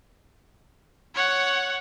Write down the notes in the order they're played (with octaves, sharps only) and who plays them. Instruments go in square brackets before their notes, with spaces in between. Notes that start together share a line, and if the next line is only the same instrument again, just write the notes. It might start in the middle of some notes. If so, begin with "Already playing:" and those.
[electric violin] C#5 F#5